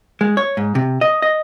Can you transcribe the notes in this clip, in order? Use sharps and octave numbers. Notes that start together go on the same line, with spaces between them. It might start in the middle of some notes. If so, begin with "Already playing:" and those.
G#3
C#5
G#2
C3
D#5
D#5